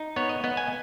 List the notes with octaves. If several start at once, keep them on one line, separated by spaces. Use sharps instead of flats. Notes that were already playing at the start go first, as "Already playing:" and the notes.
Already playing: D#4
B3 C#5
D#5
B3 D#5
G#5